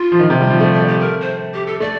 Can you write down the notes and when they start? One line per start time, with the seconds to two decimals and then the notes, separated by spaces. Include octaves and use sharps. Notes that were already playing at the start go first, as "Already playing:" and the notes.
Already playing: F4
0.12 F3
0.19 D#3
0.30 C3
0.40 G3
0.50 F3
0.60 A3 C5
0.73 D5
0.80 A3
0.87 G4
1.00 A#4
1.21 C5
1.54 G4
1.67 A4
1.80 A3 D5